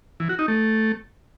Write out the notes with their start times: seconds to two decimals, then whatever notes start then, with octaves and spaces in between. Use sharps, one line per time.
0.20 E3
0.29 F#4
0.39 D#4
0.48 A3